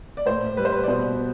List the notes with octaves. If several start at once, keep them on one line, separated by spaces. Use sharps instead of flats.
D5
A2 C5
G3 B4
C5
B4
D5
B2 C5